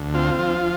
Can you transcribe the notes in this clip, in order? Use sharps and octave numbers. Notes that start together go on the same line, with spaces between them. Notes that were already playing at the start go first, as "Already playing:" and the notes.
Already playing: D2
C4 F4
F3